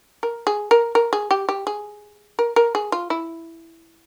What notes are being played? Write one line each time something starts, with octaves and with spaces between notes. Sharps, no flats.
A#4
G#4
A#4
A#4
G#4
G4
G4
G#4
A#4
A#4
G#4
F4
E4